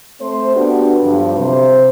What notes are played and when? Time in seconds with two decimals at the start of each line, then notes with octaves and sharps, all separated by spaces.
0.19 A3 C4 C5
0.56 B3 D4 F#4 G4
1.03 G2 D3 F3 F#3
1.37 C3 C5